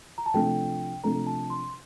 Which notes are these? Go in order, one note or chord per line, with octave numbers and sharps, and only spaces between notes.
A#5
A5
C3 F3 A3 D4 A4 G5
C3 F3 A3 D4 A4 A#5
A5
C6